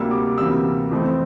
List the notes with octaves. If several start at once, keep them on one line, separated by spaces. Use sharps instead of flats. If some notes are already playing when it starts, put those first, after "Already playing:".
Already playing: D2 C3 G3 A#3 E6
D6
D2 C3 E3 G3 A#3 E6
F2 E3 A3 C4